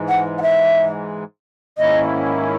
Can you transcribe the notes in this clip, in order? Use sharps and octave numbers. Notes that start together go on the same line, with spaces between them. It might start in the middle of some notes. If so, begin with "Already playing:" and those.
Already playing: G#2 E3 G#3
F#5
F#5
E5
G#2 D#3 A#3 C#4 E4 D#5